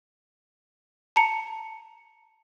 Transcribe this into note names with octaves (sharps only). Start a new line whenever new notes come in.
A5 A#5 C#7